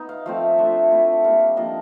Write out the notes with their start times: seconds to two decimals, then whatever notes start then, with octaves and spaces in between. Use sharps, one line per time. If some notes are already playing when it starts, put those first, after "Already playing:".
Already playing: B3 D#4
0.09 F5
0.26 F3 A3 C4 F5
0.58 A3 D4 F4 E5
0.91 A3 C4 E4
1.13 F#5
1.24 G3 A#3 D#4 F5
1.40 F5
1.57 F3 A#3 D4 D#5